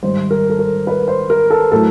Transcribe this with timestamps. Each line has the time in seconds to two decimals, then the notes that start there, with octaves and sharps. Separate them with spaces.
0.03 G#2 D#3 G3 C5
0.30 A#4
0.50 A4
0.59 A#4
0.87 B4
1.08 C5
1.30 A#4
1.50 A4
1.71 A2 F#3 A3 A4